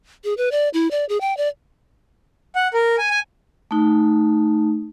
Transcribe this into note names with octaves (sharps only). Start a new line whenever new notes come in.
G#4
B4
D5
E4
D5
G#4
G5
D5
F#5
A#4
G#5
G#5
A3 D#4